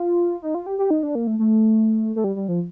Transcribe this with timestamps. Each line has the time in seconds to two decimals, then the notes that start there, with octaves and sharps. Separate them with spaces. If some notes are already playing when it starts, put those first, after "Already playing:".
Already playing: F4
0.42 D#4
0.55 F4
0.66 G4
0.79 G4
0.90 D#4
1.03 D4
1.15 A#3
1.27 A3
1.39 A3
2.16 A3
2.24 G3
2.36 G3
2.48 F3